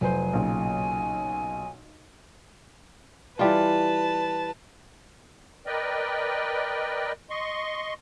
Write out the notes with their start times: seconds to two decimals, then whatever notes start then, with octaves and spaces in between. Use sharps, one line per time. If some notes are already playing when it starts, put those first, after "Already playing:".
0.01 F1 F#3 B4 C5 G#5
0.33 B1 A#2 C#3
3.39 E3 G3 F4 B4 A5
5.66 A#4 B4 D5 D#5 G5
7.30 D#5 C6 C#6